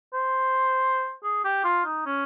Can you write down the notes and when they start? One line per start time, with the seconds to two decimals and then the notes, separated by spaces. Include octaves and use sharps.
0.14 C5
1.23 G#4
1.45 G4
1.64 F4
1.85 D#4
2.06 C#4